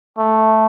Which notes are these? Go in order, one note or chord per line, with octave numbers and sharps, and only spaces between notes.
A3